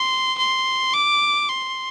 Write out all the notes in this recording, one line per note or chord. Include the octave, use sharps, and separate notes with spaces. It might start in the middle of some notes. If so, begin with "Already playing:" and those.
Already playing: C6
C6
D6
C6